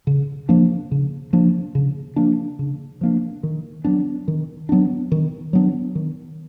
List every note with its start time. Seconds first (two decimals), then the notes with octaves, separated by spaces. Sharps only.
0.07 C#3
0.49 F3 A#3 D4
0.91 C#3
1.33 F3 A#3 D4
1.75 C#3
2.16 F3 A#3 D4
2.59 C#3
3.01 F3 A#3 D4
3.43 D#3
3.84 F#3 B3 D4
4.28 D#3
4.69 F#3 B3 D4
5.12 D#3
5.53 F#3 B3 D4
5.95 D#3